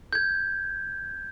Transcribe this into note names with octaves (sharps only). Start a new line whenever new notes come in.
G6 G#6